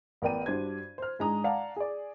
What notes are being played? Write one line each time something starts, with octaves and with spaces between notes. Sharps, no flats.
A1 B3 A#4 D5 G5 D#7
G2 D4 F#4 C5 G#6
C5 F6
G#2 G#3 D4 A#5 D#6
D5 F5 F#5 A5 A#5
G#4 D5